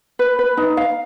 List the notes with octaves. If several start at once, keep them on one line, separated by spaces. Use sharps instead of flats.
B4
B4
D#4
F5